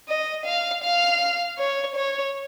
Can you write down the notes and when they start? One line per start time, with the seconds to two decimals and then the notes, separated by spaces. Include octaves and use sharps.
0.08 D#5
0.45 F5
0.83 F5
1.58 C#5
1.95 C#5